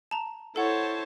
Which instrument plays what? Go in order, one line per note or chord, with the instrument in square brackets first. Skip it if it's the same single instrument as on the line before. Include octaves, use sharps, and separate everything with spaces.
[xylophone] A5 A#5
[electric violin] E4 C5 [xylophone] A4 F#5 [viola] C#5 A5